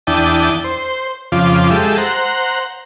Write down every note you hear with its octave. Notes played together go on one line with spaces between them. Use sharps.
E2 D4 E4 G5 A5 D#6
C5
F2 C#3 F3 F4 D6
G#3 G4 A4 E5
C5 F#5 A#5